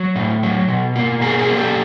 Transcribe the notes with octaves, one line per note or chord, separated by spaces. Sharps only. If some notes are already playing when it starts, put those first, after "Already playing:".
Already playing: F#3
A2
F#3
B2
A#3
B2 G#4 A#4
G#4 A#4
A#3
G4 A4